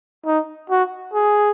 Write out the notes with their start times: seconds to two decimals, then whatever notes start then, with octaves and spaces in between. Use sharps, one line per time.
0.26 D#4
0.70 F#4
1.14 G#4